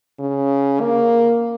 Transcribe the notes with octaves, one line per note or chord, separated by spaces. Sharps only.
C#3
A#3